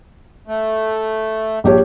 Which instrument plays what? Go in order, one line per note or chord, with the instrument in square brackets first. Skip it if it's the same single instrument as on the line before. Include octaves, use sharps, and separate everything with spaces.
[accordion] A3
[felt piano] A#1 G4 C#5